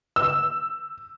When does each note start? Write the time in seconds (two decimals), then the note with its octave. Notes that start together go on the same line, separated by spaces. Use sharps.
0.16 E6